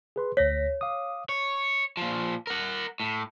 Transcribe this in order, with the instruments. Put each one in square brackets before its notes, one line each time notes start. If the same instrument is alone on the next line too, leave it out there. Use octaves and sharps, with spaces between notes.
[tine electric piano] G#4 B4 C6
[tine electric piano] D2 A#6 B6 [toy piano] C#5
[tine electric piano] F5 D6 D#6
[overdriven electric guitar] C#5
A#2 F3
A#4 F#5
A2